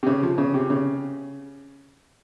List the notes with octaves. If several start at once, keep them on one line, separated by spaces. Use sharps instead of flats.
C3
C#3
F3
C#3
C3
C#3